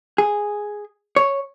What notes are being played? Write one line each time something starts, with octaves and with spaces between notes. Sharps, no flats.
G#4
C#5